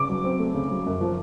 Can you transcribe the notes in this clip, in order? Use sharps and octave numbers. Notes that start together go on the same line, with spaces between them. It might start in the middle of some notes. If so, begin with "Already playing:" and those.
Already playing: C#3 D6
F#3
C4
A3
C#3
F#3
F#2
F3